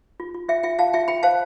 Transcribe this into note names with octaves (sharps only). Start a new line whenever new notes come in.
F4
F4
F4 E5 G5
F4 E5 G5
F4 F5 A5
F4 E5 G5
F4 G5 B5
C5 F5 A5